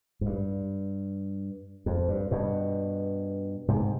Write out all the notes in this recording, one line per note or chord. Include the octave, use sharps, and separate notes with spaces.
G#2
G2
F2
G2
G2 B2
G#2 C3